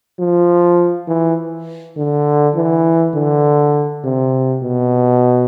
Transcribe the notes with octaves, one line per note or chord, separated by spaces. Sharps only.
F3
E3
D3
E3
D3
C3
B2